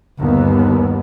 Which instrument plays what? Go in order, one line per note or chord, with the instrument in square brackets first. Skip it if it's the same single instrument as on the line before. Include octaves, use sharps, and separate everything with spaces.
[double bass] G1 [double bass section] D#2 B3